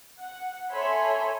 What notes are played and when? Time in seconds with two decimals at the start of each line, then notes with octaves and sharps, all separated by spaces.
0.20 F#5
0.71 A4 C#5 E5 G#5 B5 C6